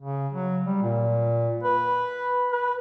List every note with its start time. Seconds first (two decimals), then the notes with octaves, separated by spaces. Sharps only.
0.01 C#3
0.33 F#3
0.66 G3
0.82 A#2
1.63 B4
2.52 B4